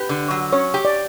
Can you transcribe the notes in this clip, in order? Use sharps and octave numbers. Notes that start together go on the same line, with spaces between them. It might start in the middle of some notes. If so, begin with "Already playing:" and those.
Already playing: G4 B4
D3
F#3
C#4 C#5
G4
D5